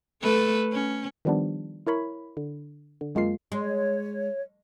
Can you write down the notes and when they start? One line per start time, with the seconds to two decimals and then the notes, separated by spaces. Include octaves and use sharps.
0.22 A3 A4 B4
0.73 C#4
1.25 D#3 F3 G3 B3 D4
1.87 E4 A#4 C#5 B5
2.37 D3
3.01 D3
3.15 F#2 G#3 A#3 F4 C7
3.52 G#3 C#5